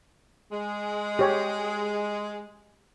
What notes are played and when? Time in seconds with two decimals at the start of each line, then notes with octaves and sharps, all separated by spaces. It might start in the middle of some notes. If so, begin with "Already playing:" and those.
0.50 G#3
1.19 G4 C#5 G#5